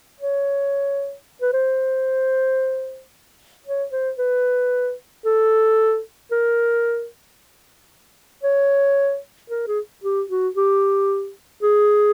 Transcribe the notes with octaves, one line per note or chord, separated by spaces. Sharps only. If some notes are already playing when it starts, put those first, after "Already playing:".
C#5
B4
C5
C#5
C5
B4
A4
A#4
C#5
A#4
G#4
G4
F#4
G4
G#4